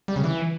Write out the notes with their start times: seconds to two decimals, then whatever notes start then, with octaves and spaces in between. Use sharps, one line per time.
0.08 G3
0.16 C#3
0.24 E3